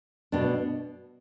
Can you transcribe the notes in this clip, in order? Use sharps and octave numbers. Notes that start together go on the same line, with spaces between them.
B2 B3 D4